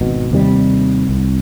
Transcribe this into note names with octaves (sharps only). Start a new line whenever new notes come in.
G#1 B2
D#2 C3 D#3 G3
C2